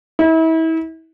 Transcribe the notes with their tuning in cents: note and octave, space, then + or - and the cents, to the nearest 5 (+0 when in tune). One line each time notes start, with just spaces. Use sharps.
E4 -35